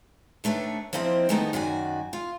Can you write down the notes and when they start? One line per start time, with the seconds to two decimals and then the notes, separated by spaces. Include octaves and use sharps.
0.44 D#3 A3 D4 B4 C#5
0.93 F3 A#3 C4 E4 C5 D#5
1.29 D#3 G#3 A3 B3 D4 D#4
1.53 F#2 D#3 F#4 D5 G#5
2.13 F4